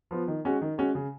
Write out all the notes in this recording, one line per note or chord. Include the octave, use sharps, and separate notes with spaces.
F3 B3 F4
D#3
G#3 C#4 F#4
D#3
G#3 C#4 F#4
C#3